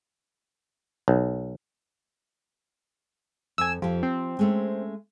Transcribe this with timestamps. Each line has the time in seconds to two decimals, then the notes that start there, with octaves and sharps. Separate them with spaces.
1.08 B1
3.58 F2 G#5 E6
3.82 F2 F3 G4
4.03 C4
4.39 G#3 A3 C#4